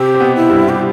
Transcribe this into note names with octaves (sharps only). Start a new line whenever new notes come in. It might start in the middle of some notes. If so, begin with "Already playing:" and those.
Already playing: C3 C4 G4
C4
B2 B3
E4
G2 G3
G4